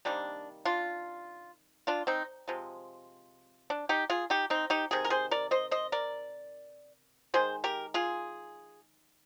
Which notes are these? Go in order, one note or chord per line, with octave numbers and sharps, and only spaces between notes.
C3 D#3 G3 A#3 D4
D4 F4
D4 F4
C4 D#4
C3 F3 G#3
D4
D#4 G4
F4 G#4
D#4 G4
C4 D#4
D#4 G4
C3 D#3 G#4
A#4
G#4 C5
A#4 D5
C5 D#5
C5 D#5
A#4 D5
D#3 G#3 G#4 C5
G4 A#4
F4 G#4